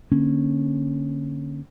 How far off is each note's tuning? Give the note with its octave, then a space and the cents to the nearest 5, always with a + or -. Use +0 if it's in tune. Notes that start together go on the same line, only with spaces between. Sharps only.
D3 +0 A#3 +0 C#4 -15